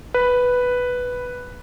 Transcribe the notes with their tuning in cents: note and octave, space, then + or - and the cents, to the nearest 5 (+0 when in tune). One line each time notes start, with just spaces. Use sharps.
B4 +0